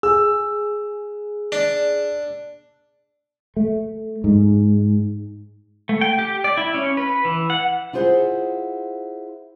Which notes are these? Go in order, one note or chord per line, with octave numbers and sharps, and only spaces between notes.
G#4 E6
D4
A3
G#2
A3
G5
G4
D5
E4
C#4
B4
E3
F#5
E4 F4 G#4 C5 C#5 F#5